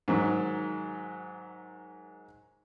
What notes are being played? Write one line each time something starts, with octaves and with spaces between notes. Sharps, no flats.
G#2 D#3 F#3